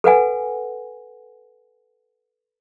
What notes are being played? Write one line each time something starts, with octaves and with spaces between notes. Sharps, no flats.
A4 B4 F#5 G#5